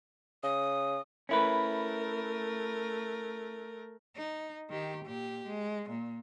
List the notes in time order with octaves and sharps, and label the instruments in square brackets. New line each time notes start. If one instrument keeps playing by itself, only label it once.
[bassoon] C#3 [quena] D#6
[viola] A3 A#4 [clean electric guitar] C#4 E4 B4
[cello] D#4
D#3 G4
A#2 G4
G#3
A#2